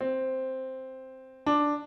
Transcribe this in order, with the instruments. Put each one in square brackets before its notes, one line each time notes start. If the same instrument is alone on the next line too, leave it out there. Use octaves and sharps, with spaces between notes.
[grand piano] C4
D4